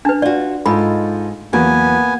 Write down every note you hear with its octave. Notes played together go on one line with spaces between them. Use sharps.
D4 B4 A5
F4 F#4 D5
G#2 D#4 F4 A4 B5
E2 F#3 A#3 B3 G#5